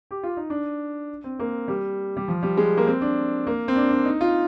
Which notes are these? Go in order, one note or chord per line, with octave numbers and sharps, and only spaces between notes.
G4
F4
D#4
D4
C4
A#3
G3
G3
F3
G3
G#3
A#3
C4
D4
A#3
C4
D4
D4
D#4
F4